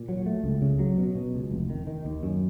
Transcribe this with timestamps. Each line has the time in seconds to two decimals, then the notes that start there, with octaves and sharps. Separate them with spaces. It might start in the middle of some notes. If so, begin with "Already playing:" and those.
Already playing: A#2
0.09 F#3
0.26 A3
0.44 C#2
0.62 C#3
0.79 F#3
0.97 B2
1.15 B2
1.34 C#2
1.51 F1
1.70 D#3
1.87 D#3
2.05 D#2
2.23 F#2